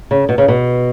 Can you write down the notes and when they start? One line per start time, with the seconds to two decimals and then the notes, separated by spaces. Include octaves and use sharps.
0.11 C#3
0.29 B2
0.38 C#3
0.48 B2